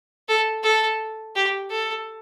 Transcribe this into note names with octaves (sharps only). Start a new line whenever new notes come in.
A4
A4
G4
A4